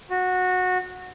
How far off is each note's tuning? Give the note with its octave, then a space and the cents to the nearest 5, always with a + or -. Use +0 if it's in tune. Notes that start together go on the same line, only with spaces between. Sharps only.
F#4 -15